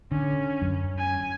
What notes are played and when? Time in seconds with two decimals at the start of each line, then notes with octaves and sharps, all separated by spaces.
0.12 D3 C#4
0.62 F#2
0.98 G#5